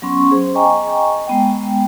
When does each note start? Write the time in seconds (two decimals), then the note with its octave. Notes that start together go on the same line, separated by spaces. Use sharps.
0.02 F#3 B3 C#4 C6 C#6
0.31 G#4 C5
0.55 D#5 G5 G#5 A#5 C#6 D6
1.27 G#3 B3 G5